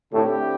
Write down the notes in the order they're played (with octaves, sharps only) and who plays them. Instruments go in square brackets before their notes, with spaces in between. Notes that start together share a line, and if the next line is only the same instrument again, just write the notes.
[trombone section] A2 [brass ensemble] D3 C4 E4 G4